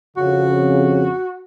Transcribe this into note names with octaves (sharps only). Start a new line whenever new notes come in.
F2 C#3 F#4